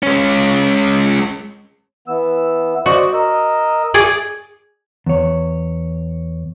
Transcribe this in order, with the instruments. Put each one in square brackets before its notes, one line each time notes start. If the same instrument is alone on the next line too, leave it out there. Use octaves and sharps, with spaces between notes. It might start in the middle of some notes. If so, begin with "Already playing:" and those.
[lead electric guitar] G#3 C#4
[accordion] E3 B3 E6
[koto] F#4 [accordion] C5 D5 D#5
[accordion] A#4 D#5 E6
[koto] G#4 D5 G#5
[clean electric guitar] E2 C#5